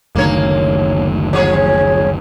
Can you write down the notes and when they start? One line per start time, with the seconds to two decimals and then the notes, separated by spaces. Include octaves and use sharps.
0.15 F#1 D2 D#3 A#3 C#5
1.33 F3 G#4 C#5